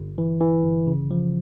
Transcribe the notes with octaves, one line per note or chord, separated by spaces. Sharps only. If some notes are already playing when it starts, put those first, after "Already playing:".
Already playing: G1
E3
E3
G1
C#3
F3